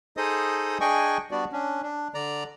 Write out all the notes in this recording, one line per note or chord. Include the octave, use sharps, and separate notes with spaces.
D#4 G#4 A4 C5 D#5 D#6
D4 G#4 D#5 G5 G#5 C#6
G3 B3 D4 F#4 D5
C#4 D4
D4
D3 D5 A#5